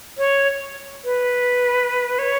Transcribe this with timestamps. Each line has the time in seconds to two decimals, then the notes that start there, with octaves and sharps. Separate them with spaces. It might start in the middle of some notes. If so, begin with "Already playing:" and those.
0.18 C#5
1.04 B4
2.19 C#5